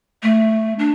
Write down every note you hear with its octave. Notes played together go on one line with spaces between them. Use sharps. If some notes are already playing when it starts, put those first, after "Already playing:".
A3
D4